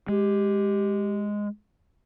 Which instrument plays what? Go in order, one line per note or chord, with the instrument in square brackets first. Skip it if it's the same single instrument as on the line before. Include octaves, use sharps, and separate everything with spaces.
[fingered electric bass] G#3 [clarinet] G4